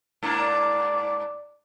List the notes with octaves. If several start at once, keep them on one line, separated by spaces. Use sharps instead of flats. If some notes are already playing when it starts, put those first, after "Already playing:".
G#2 A#3 D4
D5